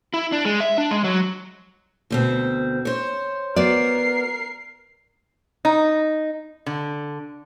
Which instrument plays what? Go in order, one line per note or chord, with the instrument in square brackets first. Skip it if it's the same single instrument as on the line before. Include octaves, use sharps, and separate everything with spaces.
[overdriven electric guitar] E4
D4
G#3
E5
D4
G#3
F#3
[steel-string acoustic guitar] D2 B2 C4
C5 C#5
[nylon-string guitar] B3 F#4 D5 [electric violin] A#4 C7
[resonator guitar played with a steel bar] D#4
D3